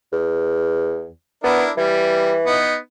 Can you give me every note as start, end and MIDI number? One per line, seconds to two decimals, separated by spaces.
0.12 1.08 40
1.44 1.64 59
1.44 1.71 62
1.44 1.71 64
1.44 1.71 70
1.77 2.64 52
1.77 2.33 55
2.46 2.75 59
2.46 2.75 63